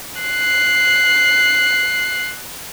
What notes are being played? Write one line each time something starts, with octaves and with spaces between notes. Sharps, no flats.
F#6 C7